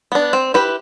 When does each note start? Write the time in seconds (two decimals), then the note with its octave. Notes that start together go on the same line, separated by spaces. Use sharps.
0.12 B3 D4
0.33 C4
0.54 E4 G4 B4